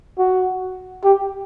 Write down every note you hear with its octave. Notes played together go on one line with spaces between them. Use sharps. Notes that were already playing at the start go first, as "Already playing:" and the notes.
F#4
G4